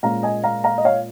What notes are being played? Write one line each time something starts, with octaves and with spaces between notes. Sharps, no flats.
A#2 G#3 C#4 F5 A#5
D#5 G#5
F5 A#5
F5 A#5
D#5
C#5 F5